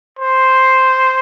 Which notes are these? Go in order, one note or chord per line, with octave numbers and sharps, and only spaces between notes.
C5